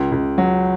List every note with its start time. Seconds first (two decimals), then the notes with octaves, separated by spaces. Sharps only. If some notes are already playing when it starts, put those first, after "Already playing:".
Already playing: C#2
0.12 C#2
0.38 F#3